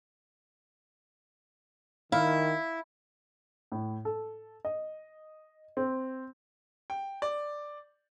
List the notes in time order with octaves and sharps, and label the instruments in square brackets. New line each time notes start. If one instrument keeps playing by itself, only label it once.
[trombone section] D#3 [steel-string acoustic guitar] E4 [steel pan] F5
[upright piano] A2
A4
D#5
C4
[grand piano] G5
D5